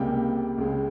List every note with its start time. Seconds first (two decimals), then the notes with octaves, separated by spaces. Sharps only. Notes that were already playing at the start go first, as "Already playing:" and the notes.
Already playing: C#2 C3 G3 A#3 G5
0.58 C#2 C#3 G#3